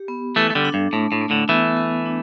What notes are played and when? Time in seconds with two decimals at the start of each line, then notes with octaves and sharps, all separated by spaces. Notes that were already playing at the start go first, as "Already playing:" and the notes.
Already playing: G4
0.08 B3
0.36 E3 A3 A4
0.50 A3
0.55 D3 G3
0.65 D4
0.74 G2
0.93 A2 A3
1.12 A2
1.21 A3
1.30 A2 D3
1.49 E3 A3 B3
1.77 B3
2.06 D4